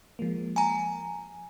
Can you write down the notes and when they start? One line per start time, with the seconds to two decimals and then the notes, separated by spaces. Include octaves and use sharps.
0.19 F3 G#3 A#3
0.56 G#5 A#5